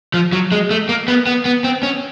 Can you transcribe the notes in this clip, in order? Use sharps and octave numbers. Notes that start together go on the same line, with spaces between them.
F3
F#3
G#3
A3
A#3
B3
B3
B3
C4
C#4